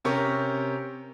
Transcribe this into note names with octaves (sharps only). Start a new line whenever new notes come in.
C3 C#4 G4 A#4 C#6